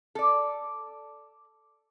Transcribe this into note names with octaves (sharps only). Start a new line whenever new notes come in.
A4 D5